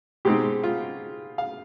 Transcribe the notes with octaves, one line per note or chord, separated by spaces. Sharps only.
B2 G#3 C4 D#4 G4
F4
F5